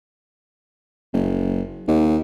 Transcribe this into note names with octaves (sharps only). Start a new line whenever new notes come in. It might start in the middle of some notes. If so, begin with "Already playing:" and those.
F#1
D#2